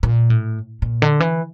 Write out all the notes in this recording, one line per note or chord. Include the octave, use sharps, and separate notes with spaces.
A#2
A2
A#2
D3
E3